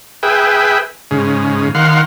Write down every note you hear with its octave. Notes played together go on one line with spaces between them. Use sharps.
G#4 B4 E5 G5
G#2 C#3
D#3 F5 F#5 C6